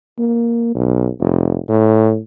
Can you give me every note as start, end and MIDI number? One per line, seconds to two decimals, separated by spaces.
0.19 0.73 58
0.75 1.09 35
1.20 1.58 29
1.68 2.18 45